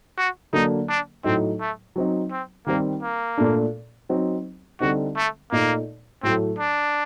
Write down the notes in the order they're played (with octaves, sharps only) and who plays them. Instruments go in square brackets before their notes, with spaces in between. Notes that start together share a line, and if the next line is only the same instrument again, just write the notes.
[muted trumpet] F#4
[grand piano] D3 F#3 A#3 D4 [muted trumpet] D#4
[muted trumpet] D4
[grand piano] A2 F#3 A3 D#4 [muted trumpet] C4
[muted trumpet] A3
[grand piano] F#3 C4 D#4
[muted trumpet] C4
[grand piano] D#3 G3 C4 [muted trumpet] A#3
[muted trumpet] A#3
[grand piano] A#2 A3 D4
F#3 C4 D#4
[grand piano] D3 G3 C4 D#4 [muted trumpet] F#4
[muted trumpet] A3
[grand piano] A#2 A3 D#4 [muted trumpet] A#3
[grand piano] A2 F#3 A3 [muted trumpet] C4
[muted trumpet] D4